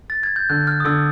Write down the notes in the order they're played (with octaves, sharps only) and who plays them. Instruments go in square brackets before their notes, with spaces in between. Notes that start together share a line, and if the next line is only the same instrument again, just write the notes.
[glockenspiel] A6
G#6
G6
[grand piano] D3 [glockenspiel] F#6
[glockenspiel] F6
D#6
[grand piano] D3 [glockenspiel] E6